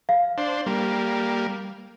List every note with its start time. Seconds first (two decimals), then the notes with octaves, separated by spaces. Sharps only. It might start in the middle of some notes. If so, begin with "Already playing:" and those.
0.09 F5
0.38 D4 C5
0.66 G3 A#3